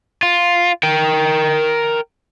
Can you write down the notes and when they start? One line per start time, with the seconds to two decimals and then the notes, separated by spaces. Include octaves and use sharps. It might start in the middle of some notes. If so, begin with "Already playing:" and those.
0.23 F4
0.83 A#4 G5